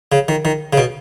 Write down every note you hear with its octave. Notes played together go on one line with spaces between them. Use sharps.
C#3
D#3
D#3
C#3
B2